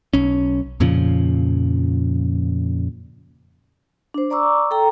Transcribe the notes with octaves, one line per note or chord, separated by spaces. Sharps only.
B1 C#4
F2 A#2 C#3 F3
D4 C5
D5 A#5 C#6 D6 E6
A4 G5 A#5